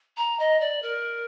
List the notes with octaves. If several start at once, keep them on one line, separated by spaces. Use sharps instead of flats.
A#5
D#5
D5
A#4